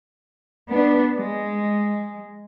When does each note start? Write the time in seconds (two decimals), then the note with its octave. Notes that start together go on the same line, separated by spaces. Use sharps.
0.69 B3 D4
1.17 G#3